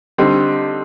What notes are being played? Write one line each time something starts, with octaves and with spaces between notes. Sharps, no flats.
D3 G3 C4 D#4 G4